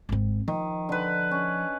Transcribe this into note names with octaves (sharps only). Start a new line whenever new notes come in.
G#1 C4
D#3 F3
D3 B4
C#4